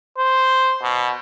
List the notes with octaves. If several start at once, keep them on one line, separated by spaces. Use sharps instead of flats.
C5
B2